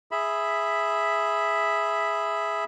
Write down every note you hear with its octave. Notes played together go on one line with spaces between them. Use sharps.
G#4 E5 B5